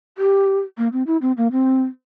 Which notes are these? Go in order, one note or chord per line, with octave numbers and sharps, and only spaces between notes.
G4
A#3
C4
E4
C4
A#3
C4